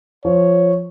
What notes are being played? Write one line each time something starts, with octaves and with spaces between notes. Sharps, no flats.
F3 C#5